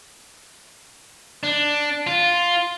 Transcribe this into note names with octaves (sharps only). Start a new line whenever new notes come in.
D4
F4